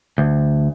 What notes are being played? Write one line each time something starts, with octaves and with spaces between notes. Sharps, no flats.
D2